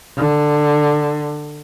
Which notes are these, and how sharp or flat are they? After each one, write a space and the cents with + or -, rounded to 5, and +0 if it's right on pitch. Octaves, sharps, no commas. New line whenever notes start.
D3 +15